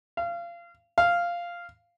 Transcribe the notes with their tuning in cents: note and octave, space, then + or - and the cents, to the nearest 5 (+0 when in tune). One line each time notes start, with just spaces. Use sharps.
F5 -25
F5 -5